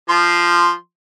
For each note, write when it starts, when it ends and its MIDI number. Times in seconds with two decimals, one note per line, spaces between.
0.09 0.73 53
0.09 0.73 84